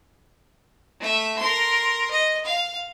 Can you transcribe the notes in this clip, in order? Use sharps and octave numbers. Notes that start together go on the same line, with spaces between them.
A3 E5
A#4 C6
D#5
F5